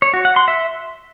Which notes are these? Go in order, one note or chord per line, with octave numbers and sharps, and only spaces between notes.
C#5
F#4
F#5
C6
E5